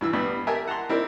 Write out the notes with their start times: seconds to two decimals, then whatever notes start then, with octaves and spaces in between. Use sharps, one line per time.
0.01 G2 E3 E6
0.13 G2 G3 B3
0.47 G4 A#4 E5 G#5 A5
0.67 F#5 A5 A#5 C6
0.89 C4 E4 A#4 D5